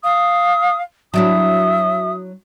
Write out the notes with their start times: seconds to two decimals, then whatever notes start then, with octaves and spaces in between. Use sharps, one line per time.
0.04 F5 D#6
1.14 F#3 D4 E4 E5 D#6